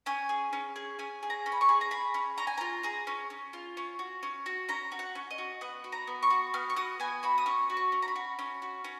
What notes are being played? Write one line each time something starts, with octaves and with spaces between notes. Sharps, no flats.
C#4 G#5
G#4
C#4
G#4
C#4 G#5
G#4
A#5
C#4
B5
C#6
G#4
A#5
G#4 B5
C#4
C#4 A#5
G#5
F4 A#5
G#4 A#5
C#4
C#4
F4
C#4
F#4
C#4
F#4
C#4 A#5
F#4
F#5
C#4
D#5
F#4
B3 F#5
F#4
A#5
B3
C#6
F#4
B3 F6
C#6
F#4 D#6
B3 G#5
F#4 B5
D#6
C#4 C#6
F#4
C#6
C#4
A#5
B5
F#4
C#4
F#4
C#4